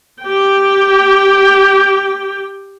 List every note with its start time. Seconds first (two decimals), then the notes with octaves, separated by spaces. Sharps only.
0.23 G4 G5